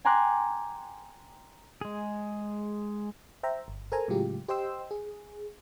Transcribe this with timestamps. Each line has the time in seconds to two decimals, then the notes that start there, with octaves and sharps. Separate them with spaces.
0.05 G5 G#5 A#5 C6 D6 F#6
1.81 G#3 G#4
3.43 C5 E5 G5 A#5
3.68 G1
3.92 A4 A#4 C5 G#5 A#5
4.08 A2 C#3 F#3 G#3 F4 G4
4.48 G4 C5 D#5 G5 C6 E6
4.91 G#4